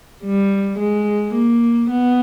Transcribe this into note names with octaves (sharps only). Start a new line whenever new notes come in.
G3
G#3
A#3
B3